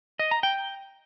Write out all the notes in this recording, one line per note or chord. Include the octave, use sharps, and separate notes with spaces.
D#5
A#5
G5